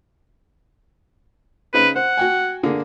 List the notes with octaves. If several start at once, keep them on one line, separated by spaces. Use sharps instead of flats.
C#3 D#4 B4 C5
C5 F#5
F#4 G5 G#5
D3 A#3 G#4